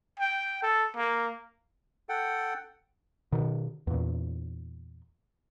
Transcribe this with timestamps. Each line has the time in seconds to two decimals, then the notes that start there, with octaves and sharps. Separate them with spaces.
0.20 G5
0.63 A4
0.95 A#3
2.09 A4 F#5 G5
3.32 B2 D#3
3.87 E2 A#2